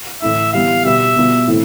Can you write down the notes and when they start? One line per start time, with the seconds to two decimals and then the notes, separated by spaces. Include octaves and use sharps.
0.22 A2 E3 A3 E4 E5
0.53 E3 G3 B3 F5
0.85 B2 G3 B3 E5
1.16 B2 G3 B3 F4
1.47 A2 E3 A3 C4